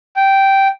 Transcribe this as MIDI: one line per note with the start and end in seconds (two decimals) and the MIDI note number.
0.16 0.68 79